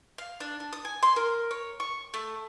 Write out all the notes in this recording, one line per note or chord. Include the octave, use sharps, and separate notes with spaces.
F5
D4
D4
D#6
G#5
C6
A#4
C#5
C#6
A3